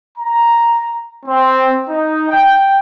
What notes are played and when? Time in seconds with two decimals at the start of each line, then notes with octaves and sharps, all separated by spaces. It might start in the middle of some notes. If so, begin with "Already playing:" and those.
0.18 A#5
1.26 C4
1.89 D#4
2.30 G5